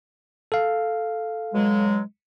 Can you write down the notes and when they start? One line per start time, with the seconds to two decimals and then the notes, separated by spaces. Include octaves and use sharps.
0.52 A4 F5
1.53 B2 F#3 G#3